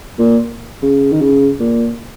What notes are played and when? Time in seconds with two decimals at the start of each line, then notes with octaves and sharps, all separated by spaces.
0.19 A#2
0.82 C#3
1.12 D#3
1.21 C#3
1.60 A#2